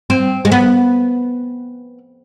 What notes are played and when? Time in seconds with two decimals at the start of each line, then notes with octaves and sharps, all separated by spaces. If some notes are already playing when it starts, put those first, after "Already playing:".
0.10 C4
0.45 G#3
0.52 B3